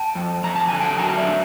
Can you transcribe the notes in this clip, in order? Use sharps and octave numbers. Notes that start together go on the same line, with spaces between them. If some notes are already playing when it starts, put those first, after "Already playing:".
Already playing: G5 A5
F2
F2 A#5
A5
D3 G#5
G5 A5
F#3 G#5 A#5
D5 E5
D4